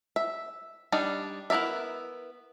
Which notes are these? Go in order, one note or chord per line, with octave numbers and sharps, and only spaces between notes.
E5
G3 D4 D#4
B3 E4 A#4 D5 E5